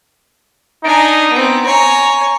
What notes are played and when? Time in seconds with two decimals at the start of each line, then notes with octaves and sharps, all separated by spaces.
0.84 D4 D#4 G#5
1.31 B3 C4
1.66 C#5 G#5 A#5